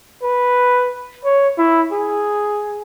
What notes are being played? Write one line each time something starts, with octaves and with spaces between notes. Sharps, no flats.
B4
C#5
E4
G#4